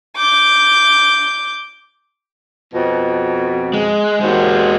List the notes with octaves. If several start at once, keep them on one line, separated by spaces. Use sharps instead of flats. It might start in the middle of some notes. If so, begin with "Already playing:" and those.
D6 G6
F2 B2
G#3
D#2 G#3 F#4 C5